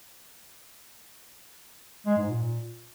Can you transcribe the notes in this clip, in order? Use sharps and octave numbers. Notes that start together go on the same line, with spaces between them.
G#3
G#2
A#2